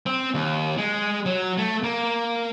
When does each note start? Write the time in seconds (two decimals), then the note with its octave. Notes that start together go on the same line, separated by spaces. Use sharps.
0.06 C4
0.34 D#2
0.78 G#3
1.26 F#3
1.58 A3
1.83 A#3